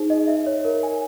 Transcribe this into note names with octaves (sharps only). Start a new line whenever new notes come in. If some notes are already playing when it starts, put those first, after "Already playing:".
Already playing: D#4 G#4 C5
D#5
E5
C#5
A#4
G#5